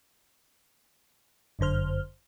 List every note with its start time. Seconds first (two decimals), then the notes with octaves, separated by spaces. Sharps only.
1.59 G1 F#2 D3 C5 F6